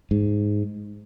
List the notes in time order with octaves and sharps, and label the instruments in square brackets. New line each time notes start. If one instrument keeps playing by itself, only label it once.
[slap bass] G#2